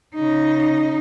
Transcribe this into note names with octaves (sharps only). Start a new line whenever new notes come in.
C#3 D#4